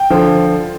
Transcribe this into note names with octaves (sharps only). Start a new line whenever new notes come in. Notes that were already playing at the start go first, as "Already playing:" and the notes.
Already playing: G5
D3 F3